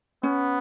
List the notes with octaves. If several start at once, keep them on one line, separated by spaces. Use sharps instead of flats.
B3 C#4